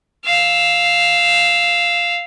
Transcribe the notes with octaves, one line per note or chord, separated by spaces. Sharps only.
F5 E6